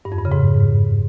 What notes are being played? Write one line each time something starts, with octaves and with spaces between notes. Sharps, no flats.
G2
F2
G2
C#3
G#2